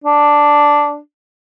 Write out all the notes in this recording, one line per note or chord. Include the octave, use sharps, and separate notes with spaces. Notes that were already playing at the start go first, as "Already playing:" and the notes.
D4